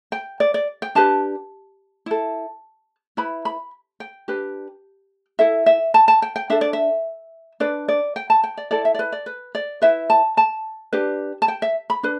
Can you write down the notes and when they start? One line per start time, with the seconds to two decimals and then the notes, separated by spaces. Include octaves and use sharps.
0.12 G5
0.40 D5
0.54 D5
0.82 G5
0.95 D4 G4 B4 A5
2.06 E4 A4
3.17 E4 B4 B5
3.45 B5
4.00 G5
4.28 D4 G4 B4
5.39 E4 A4 E5
5.66 E5
5.94 A5
6.08 A5
6.22 G5
6.36 G5
6.50 D4 A4 E5
6.61 D5
6.73 E5
7.60 D4 B4 D5
7.88 D5
8.16 G5
8.30 A5
8.44 G5
8.58 D5
8.71 E4 A4 D5
8.85 E5
8.95 D5
8.99 B4
9.12 D5
9.26 B4
9.55 D5
9.82 E4 B4 E5
10.10 A5
10.37 A5
10.93 D4 G4 B4
11.42 A5
11.48 G5
11.62 E5
11.90 B5
12.03 D4 B4